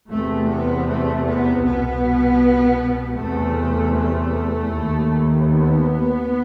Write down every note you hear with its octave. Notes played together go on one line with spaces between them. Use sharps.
E2 C3 A3
B3
A3
B3
C2 B2 B3
E2 C3 A3
A3
D#2
B3